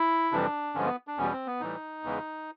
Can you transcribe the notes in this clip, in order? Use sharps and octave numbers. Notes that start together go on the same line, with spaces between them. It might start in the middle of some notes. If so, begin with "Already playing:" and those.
Already playing: E4
F2 C3 E3 G3 D4
G2 D3 F3 G#3 C#4
B3
D4
E2 B2 G3 C#4
C4
B3
A2 E3 G3 D#4
E2 C#3 E3 G#3